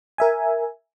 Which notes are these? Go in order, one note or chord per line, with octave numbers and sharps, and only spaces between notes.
A#4 E5 G#5